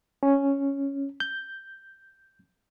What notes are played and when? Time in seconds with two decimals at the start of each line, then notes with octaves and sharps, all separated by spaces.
0.23 C#4
1.20 G6